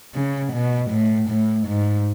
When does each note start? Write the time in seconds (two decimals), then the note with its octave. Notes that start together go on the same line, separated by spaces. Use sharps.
0.15 C#3
0.53 B2
0.91 A2
1.29 A2
1.67 G#2